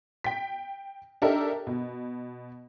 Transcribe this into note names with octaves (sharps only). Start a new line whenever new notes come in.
G5 B6
D4 D#4 G4 A4 A#4 E5
B2